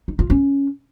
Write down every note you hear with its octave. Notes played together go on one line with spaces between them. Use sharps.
D#4
F4
C#4